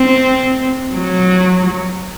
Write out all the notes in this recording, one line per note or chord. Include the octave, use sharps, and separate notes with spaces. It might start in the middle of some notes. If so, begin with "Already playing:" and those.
Already playing: C4
F#3